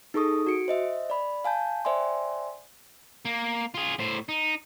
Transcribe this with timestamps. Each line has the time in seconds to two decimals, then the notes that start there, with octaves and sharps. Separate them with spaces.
0.14 D#4 G#4 A4 C#6 D#6
0.47 F#4 C#7 D7
0.68 C5 D#5 E5
1.10 D5 B5
1.45 F5 G#5 A5 G6
1.85 C5 D5 E5 G5 G#5 C6
3.25 A#3
3.74 F4 G#4
3.99 A2 C5
4.29 D#4